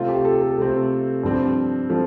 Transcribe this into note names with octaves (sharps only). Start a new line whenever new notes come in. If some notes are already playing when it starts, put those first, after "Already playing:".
Already playing: C3 A3 C4 F4
G4
A4
A4
C3 A3 C4
G2 F3 C4
F3 C4 A4